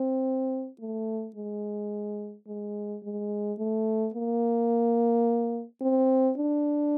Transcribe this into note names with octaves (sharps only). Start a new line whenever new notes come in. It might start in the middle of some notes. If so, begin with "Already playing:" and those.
Already playing: C4
A3
G#3
G#3
G#3
A3
A#3
C4
D4